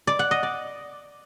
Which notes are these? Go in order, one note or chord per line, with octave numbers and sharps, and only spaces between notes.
D5
F#5
D#5
D5